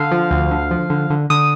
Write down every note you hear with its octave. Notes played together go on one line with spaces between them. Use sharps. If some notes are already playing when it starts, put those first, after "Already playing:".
Already playing: D3 F5
F3
D2
D3
F3
D3
D3
D3 D#6